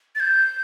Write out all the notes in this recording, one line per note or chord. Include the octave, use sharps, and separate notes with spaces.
A6
G6